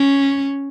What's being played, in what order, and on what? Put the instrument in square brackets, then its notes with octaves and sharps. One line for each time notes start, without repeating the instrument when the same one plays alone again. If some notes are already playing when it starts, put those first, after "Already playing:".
Already playing: [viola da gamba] C#4